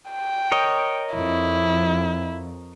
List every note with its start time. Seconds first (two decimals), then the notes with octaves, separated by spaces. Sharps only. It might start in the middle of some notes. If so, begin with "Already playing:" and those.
0.11 G5
0.52 A#4 C#5 D#5
1.14 F2 E4